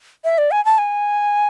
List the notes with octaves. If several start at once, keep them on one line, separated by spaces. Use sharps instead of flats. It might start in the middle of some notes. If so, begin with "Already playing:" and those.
E5
D5
G#5
A5
G#5